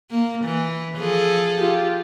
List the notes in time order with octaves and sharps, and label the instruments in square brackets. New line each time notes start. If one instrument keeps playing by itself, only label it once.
[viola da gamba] A#3
E3
F3 G#4 A4
[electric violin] F4 G4